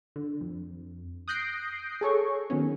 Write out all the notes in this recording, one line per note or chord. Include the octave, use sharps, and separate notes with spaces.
D3
F2
D#6 F#6 G6 A#6 C7 D7
G#4 A4 C#5 C#6
D#3 F#3 B3 C#4